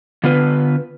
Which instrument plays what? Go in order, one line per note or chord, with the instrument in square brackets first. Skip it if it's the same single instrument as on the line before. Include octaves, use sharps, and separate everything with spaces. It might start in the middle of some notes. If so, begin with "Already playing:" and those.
[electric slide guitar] D3 B3 F4 B4